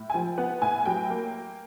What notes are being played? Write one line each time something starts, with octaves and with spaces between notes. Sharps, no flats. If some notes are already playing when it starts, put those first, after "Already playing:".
Already playing: A2
G#5
F3 G5
B3 F#5
A2 G#5
F#3 G5
A#3